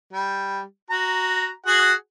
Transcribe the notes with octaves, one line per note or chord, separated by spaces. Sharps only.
G3
F#4 A#5
F#4 G#4 F#5